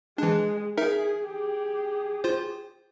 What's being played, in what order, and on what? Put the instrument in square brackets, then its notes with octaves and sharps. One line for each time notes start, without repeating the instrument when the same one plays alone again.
[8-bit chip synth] E3 D4 [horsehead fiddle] G#3
[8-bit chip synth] D#4 A#4 E5 [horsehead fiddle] G#4
[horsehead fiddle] G4 G#4
[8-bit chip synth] F4 C5